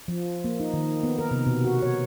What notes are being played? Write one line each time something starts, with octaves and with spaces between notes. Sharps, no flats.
F3
A#3
D#4
D#3
B3
A#4
C3
B2
F#4
C#5